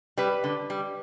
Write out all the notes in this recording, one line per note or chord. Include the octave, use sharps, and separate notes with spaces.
G3 B4
D3
G3